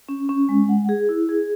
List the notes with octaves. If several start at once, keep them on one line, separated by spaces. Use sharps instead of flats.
C#4
C#4
G#3
F#5
G#4
E4
G#4